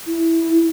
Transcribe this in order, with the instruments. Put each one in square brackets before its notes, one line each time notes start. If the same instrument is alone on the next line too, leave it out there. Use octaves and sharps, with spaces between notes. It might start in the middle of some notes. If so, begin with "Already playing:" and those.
[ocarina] E4